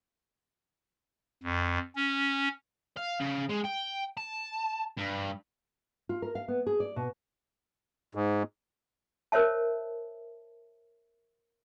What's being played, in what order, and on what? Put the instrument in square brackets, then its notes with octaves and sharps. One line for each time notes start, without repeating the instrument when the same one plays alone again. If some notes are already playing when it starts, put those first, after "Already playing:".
[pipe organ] F2
C#4
[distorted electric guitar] F5
C#3
G#3
G5
A5
G2
[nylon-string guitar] F4
A#4
F5
B3
G#4
D5
B2
[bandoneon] G#2
[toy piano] A#4 C5 C#5 E5 A5